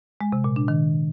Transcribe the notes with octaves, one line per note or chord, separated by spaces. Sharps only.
G#3
C3
A#2
D4
D#3